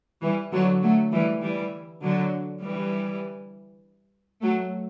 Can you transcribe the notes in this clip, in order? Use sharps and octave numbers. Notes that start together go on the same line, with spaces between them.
E3 G3
D3 F#3
F#3 A3
E3 G3
E3 G3
D3 F#3
E3 G3
F#3 A3